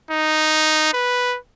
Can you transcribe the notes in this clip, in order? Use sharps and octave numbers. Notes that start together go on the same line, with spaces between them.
D#4
B4